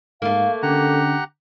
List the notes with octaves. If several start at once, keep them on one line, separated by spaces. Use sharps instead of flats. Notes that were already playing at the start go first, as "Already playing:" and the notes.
G#2 A3 A#3 F5
D3 C#4 G4 F#5 A#5